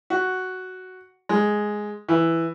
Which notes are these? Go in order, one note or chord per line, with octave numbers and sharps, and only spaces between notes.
F#4
G#3
E3